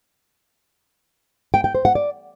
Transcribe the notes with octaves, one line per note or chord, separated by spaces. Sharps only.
G5
G5
C5
F#5
D5